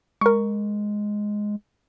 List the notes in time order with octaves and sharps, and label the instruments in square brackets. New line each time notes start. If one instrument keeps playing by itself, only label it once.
[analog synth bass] G#3 [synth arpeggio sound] A#4 C#6